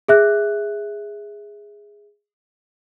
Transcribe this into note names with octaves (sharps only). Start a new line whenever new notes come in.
G#4 E5 F#6